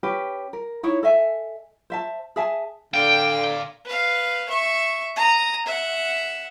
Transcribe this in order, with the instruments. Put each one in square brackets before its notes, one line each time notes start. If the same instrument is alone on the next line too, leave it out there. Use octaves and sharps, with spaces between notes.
[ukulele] C#4 G4 B4
A#4
D#4 E4 C#5
A4 D#5 E5 G#5
C5 E5 A5
G#4 E5 G#5 A5
[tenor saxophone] D3 [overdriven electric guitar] D5 F5 [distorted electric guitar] G5
[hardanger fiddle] B4 F5
E5 C#6
A#5 D#6
E5 F#5